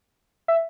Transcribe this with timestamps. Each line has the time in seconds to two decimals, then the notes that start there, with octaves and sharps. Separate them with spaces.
0.48 E5